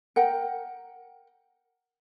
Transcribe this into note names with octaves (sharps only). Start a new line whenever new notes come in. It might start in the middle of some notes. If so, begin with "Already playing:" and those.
A#4 F#5 G5